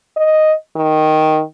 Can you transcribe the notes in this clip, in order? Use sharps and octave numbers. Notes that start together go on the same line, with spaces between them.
D#5
D#3